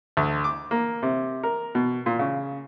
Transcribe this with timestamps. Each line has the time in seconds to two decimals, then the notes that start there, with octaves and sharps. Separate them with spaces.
0.17 D2
0.44 D6
0.71 A#3
1.03 C3
1.43 A#4
1.75 B2
2.06 A#2
2.19 C#3